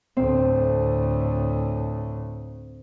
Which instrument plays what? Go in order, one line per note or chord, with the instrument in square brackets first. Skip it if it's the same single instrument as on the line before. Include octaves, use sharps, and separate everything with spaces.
[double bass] D2 A2 [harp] C4